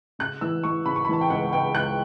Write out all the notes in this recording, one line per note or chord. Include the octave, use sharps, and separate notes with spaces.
C#3 F#6
E3 E6
E3 C#6
C#3 B5
C#6
B5
E3 A5
G5
C#2 F#5
C#2 G5
C#2 F#6